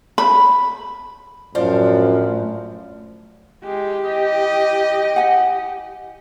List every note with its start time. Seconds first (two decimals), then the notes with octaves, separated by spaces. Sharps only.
0.18 B5
1.55 F#2 A2 F3 D4 C5 F5
3.64 G#3 E4 G4
4.03 D#5
5.16 F#5 G#5